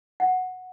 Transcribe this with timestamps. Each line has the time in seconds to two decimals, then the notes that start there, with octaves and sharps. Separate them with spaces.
0.20 F#5